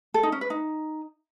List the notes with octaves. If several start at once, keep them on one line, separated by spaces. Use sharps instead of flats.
A4
D#4
C#4
B4
D#4